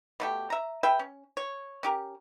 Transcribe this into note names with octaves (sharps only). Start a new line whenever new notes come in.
B2 A3 G4
E5 A#5
G#4 B4 E5 G5
C#4
C#5
C#4 G4 A#4